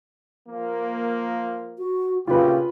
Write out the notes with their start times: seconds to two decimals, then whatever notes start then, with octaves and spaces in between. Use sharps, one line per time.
0.48 F3 A#3
1.78 F#4
2.27 D2 A#2 C#3 F4 G4 B4